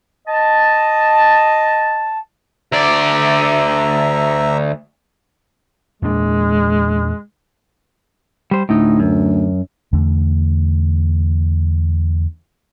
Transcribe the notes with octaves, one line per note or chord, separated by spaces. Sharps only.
D#5 A5
D2 D5 E5 A#5
E2 A#2 G#3 D4
G3 C5
D2 A2 D#4
F#2
E2 D3 A3